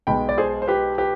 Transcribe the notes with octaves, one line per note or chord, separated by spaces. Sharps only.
B1 B2 G#3 G5 B5
D5
G#4 C5
C5
G4 B4
G4 B4